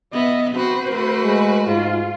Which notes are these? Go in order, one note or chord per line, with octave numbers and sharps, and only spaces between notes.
B3 D#5 E5
C4 F#4 B4 C5
A3 F#4
G#3
G#2 F4